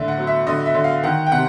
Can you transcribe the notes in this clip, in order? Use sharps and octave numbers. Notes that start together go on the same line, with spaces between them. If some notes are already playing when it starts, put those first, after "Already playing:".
Already playing: A2 D3 E5
F#5
F#3
E5
D3 D#5
E5
D3
F5
D#3 F#5
G5
C3 F#5